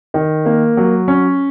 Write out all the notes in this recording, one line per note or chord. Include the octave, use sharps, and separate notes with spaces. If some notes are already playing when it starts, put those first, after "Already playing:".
D#3
A#3
F#3
C#4